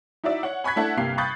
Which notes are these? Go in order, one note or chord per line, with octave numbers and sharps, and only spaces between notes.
D#4 E4 F#4 D5 E5
C#5 F#5
G#5 B5 C#6 F#6 G#6 B6
A3 D4 E4 A4 F#5 A5
G1 C3 A#3 F5 G5 C7
B5 C#6 D#6 F#6 G6 A6